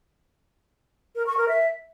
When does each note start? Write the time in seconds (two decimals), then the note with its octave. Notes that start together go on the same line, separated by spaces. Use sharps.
1.16 A#4
1.26 C#6
1.37 A#4
1.48 E5